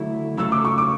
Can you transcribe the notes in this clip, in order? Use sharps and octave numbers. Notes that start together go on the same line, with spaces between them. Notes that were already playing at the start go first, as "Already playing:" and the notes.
Already playing: D3 F#3 A3 E4
C#3 F#3 A3 E6
D6
C#6
D6